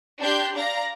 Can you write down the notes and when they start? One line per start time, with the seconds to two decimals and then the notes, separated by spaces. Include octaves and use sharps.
0.21 D4 G4 C6 G6
0.55 D5 F5 A#5 A#6